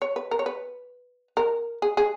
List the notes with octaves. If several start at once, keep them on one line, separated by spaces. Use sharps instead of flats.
C#5
B4
A#4
C#5
B4
A#4
G#4
G#4